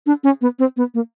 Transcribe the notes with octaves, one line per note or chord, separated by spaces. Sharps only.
D4
C#4
B3
C4
B3
A#3